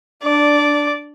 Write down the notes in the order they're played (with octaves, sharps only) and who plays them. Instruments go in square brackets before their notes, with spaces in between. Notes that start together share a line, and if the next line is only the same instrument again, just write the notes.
[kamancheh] D4 [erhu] D5